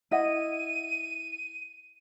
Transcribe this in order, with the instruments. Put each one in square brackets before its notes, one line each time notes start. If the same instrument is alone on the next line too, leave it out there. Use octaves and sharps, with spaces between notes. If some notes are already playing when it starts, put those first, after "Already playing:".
[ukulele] E4 D#5 F#5 [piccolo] D#7